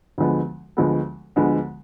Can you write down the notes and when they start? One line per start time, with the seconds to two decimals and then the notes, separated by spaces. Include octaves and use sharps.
0.18 D2 D3 F3 G#3 B3
0.77 D2 D3 F3 G#3 B3
1.36 D2 D3 F3 G#3 B3